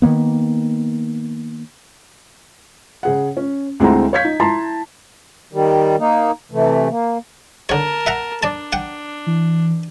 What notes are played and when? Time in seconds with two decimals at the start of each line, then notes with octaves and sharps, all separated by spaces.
0.02 D#3 E3 A#3 B3
3.03 C#3 G#4 F#5
3.37 C#4
3.80 D2 G#3 C4 E4 F#5 A#5
4.13 C#5 F5 G6 G#6 B6
4.25 D#4
4.40 E4 A5 A#5 C6
5.53 D#3 G3
5.99 A#3 D#4
6.52 C3 E3 A3
6.90 A#3
7.69 D3 A#4 C#5 A5
8.06 E5 F#5 A#5
8.43 D4 D5 A5
8.73 F#5 G5
9.27 E3